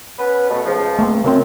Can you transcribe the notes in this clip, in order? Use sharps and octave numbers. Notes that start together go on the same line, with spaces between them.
B3 C#4 B4
B2 A3
C#2 F3
A3 A#3 C4
F#2 C#3 C4